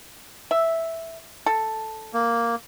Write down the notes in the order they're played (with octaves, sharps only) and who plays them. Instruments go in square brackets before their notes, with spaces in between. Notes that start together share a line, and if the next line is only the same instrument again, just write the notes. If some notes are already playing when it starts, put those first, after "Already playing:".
[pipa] E5
A4
[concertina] A#3